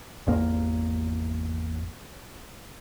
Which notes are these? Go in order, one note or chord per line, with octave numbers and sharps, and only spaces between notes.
G#1 E2 A#3